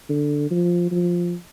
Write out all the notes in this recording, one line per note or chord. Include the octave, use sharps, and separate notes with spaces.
D3
F3
F3